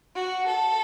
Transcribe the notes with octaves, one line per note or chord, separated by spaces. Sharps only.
F#4
A4